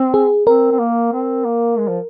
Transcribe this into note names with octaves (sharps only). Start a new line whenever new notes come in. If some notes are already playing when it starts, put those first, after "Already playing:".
Already playing: C4
G#4
C4 A#4
C4
A#3
C4
A#3
G#3
F3